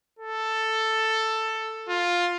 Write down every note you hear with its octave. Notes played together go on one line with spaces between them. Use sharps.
A4
F4